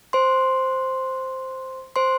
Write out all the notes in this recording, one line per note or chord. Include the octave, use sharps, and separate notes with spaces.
C5 C6
C5 C6